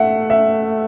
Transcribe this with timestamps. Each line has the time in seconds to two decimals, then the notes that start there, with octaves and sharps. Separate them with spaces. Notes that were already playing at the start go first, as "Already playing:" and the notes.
Already playing: A3 E5 F#5
0.30 E5